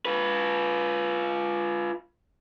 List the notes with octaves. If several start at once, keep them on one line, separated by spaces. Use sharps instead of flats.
F4 B4